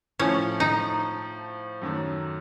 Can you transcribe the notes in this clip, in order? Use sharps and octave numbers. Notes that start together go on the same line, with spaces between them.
A2 F3 A3 C#4
D#4
F#2 D#3 F#3 A3